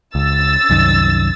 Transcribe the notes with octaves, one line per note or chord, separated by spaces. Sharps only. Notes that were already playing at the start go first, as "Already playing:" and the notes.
C#2 E6 A6
C2 F#2 D#3